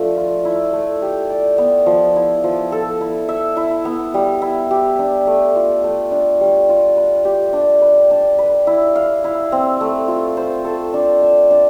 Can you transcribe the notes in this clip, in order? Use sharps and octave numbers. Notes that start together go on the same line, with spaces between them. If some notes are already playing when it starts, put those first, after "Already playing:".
Already playing: F3 A3 D4
F4
E4
A3
G4
D5
B3
F3
E4
F3
A4
E4
E5
E4
B3
G3
E4
G4
D4
A3
F4
A3
D4
G3
F4
B4
G4
D4
B4
D4
B4
E4
F5
E4
C4
A3
F4
C5
A4
D4
E5
D4